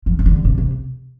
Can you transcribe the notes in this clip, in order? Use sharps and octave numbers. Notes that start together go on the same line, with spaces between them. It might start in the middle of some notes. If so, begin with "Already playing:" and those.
F3
E3
D3
C3
C3